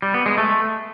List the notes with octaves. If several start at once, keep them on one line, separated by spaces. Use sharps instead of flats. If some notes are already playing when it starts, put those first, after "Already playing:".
G3
B3
G#3
A3